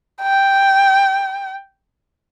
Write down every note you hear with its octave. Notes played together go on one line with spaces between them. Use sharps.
G5